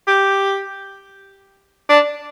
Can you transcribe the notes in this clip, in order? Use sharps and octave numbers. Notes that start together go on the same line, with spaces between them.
G4
D4